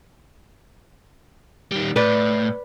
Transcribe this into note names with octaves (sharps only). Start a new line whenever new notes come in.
D#3 G3
A2 B4 D5